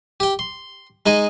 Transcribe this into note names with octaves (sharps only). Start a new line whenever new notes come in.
G4 G5
C6
G#3 D#4 G#4 D#5